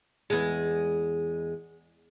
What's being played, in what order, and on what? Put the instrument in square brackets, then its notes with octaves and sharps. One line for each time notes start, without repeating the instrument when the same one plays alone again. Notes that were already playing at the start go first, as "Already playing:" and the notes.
[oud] E2 G#3